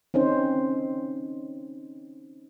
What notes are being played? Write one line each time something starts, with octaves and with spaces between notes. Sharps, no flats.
C4 C#4 D#4 C5